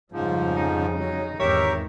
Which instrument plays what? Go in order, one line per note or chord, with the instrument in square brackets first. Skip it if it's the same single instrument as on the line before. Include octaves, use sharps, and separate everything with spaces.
[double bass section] F2 C#3 G3 [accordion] G#2 F3
[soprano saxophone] D#4
[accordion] F#3
[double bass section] G#1 E2 D#3 [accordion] G4 A#4 E5 [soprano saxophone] C#5